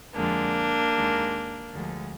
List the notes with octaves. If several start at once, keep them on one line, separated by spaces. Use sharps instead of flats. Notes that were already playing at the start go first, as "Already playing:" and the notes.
F2 D3 F3 G#3 A#3 D4
D#2 D#3 G#3
D2 D3 F3 G#3